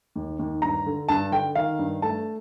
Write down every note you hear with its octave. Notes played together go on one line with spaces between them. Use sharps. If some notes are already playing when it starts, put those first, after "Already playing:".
D#2
D#2
G2 A#5
D3
G2 A5
D3 G5
D#3 F5
G2
A3 A5